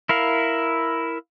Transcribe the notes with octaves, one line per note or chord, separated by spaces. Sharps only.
E4 A#4 F5